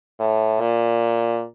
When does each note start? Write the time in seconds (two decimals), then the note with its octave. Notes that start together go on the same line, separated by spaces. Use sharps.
0.20 A2
0.60 A#2